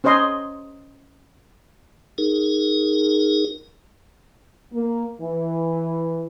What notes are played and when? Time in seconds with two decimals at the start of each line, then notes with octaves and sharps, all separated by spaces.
0.04 C#4 C5 C#5 D#5 C6
2.18 D#4 G#4 A#4
4.73 A#3
5.20 E3